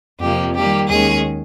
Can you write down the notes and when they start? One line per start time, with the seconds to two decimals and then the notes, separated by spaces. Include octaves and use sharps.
0.20 F2 C3 F3 A#3 G4
0.55 D#3 G3 A#3 G4
0.89 D#2 D#3 G#3 C#4 G#4